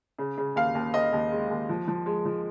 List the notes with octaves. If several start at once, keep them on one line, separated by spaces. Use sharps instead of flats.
C#3
C#3
D#2 F5
D#2
D#2 D#5
D#2
G#3
D#2
F3
F3
G#3
F3